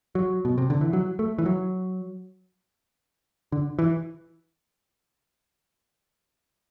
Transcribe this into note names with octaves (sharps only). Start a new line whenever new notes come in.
F#3
B2
C3
D3
E3
F#3
A3
E3
F#3
D3
E3